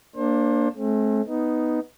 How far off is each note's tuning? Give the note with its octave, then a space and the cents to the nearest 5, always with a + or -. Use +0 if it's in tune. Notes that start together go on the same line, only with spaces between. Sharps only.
A#3 +0 D4 +0 C5 +30
A3 -35 C4 +40
B3 +0 D#4 +0